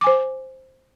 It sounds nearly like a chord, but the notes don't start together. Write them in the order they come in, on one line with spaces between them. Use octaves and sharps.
D6 G#5 C5